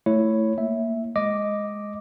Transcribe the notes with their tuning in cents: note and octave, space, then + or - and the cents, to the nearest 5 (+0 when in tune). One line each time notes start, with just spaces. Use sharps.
A3 +0 E4 +0 C#5 +0
A#3 -10 E5 -5
G#3 +0 D#5 +0 D6 +0